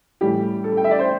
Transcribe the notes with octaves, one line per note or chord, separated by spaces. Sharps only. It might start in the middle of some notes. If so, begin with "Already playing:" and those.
A2 E3 G3 G4
A4
G5
E5
D5
C5